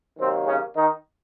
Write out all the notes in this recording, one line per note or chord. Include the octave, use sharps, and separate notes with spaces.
C3 D#3 F#3 A#3 C4
C#3 C#4
D#3 D#4